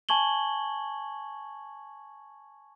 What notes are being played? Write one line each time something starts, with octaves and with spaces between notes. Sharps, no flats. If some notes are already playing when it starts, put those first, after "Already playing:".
G#5 A5 C#6 G#6 F#7 G7